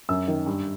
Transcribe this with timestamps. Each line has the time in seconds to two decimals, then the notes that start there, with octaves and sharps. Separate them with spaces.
0.09 F#2 E6
0.28 D#3
0.46 G2